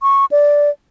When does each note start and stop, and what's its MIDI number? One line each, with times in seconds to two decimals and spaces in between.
0.02 0.25 85
0.32 0.70 74